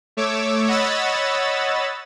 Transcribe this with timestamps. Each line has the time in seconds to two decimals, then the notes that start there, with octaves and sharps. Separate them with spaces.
0.17 A3 C#5 D6 E6
0.67 C#5 D#5 F#5 B5 E6 A6